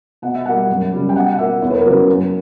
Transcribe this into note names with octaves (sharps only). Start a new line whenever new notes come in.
B2 F#5
E5
G3 A#3 F#5
F#2
C#3 G3
G5
B2 F#5
F#5
A#3 E5
E2 C#5
B4
A#4
C#3 F#3 A#3 B4
F#2